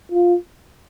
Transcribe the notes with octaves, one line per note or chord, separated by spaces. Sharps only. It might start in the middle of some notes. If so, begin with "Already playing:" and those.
F4